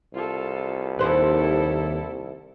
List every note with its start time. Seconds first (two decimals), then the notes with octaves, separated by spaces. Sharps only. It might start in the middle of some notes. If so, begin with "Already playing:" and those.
0.14 C2 F4 A4
0.99 D#2 E4 A4 B4 C5